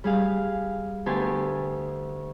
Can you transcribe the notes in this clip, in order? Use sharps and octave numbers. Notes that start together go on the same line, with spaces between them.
G3 G#4 F5
D2 B3 G4 G#5 A5 C6